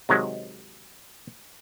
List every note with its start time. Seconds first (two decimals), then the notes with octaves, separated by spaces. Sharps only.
0.09 C3 D#3 F#3 G#3